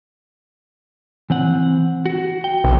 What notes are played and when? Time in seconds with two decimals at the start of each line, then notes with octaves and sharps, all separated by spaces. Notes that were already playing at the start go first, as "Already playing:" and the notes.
1.30 E3 C4 F#5
2.06 F#4
2.44 G5
2.64 B1